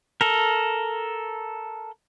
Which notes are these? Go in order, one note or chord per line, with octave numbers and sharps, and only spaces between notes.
A4 A#4